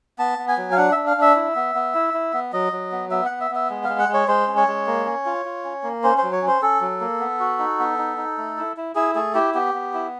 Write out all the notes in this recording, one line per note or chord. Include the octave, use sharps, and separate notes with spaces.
B3 A5
B3
G#5
F#3
F5
D4 F#5
D4 E5
F5
D4 E5
E4
B3
B3
E4
E4
B3
F#3 D#5
F#3
B3
B3 E5
B3 F#5
E5
B3 E5
G#3
G#3 F5
F#5
G#3
C#5
G#3 C5
C#4
C#5
G#3
A#3
C#4
F4
F4
C#4
A#3
C#4 C5
C5
F#3
C#5
C#4
C5
C#4 A4
F#3
A#3
B3
F#4
D#4
B3
D#4
D#4
A3
E4
E4
E4 G#4
A3 G#4
E4 G4
B3 G4
B3
E4